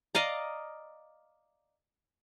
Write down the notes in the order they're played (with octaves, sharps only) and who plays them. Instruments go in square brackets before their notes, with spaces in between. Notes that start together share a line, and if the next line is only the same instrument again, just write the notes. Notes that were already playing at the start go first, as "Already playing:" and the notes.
[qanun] D5 D#5 F5 A#5